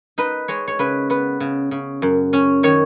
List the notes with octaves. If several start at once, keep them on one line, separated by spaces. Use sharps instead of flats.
D#4 B4
G#3 C#5
C#5
C#3 B4
B3 B4
C#3
C#3
F#2
C#4
D#3 C#5